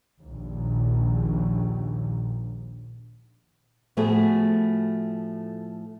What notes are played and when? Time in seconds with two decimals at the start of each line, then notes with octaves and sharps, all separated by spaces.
0.22 A#1 D#2
3.97 A2 F3 A3 B3 F#4 G#4